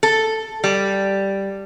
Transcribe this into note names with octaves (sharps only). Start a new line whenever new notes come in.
A4
G3